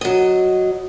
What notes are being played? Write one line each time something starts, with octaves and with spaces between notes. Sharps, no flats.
F#3 D#5